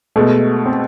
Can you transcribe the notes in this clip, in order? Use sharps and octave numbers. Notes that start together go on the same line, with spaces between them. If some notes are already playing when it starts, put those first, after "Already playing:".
B2 G#3 A3
C4